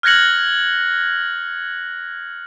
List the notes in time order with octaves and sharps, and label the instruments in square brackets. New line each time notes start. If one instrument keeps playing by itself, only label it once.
[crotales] F6 F#6 G#6 A#6 C#7 F#7